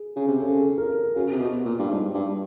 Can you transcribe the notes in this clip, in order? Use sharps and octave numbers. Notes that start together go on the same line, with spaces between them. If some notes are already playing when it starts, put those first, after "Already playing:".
Already playing: G#4
C#3
C3
C#3 A4
A#4
C#3 F#4
C3
B2
A#2
G2
G#2
G2